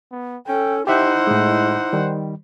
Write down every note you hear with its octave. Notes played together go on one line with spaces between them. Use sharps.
B3
C#4 A4 G5
D#4 E4 G4 C5 E5 F#5
A2 G#3
D#3 G3